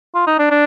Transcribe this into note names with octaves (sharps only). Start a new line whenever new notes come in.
F4
D#4
D4
D4